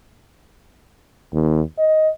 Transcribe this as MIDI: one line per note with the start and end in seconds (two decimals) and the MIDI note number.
1.33 1.61 39
1.79 2.09 75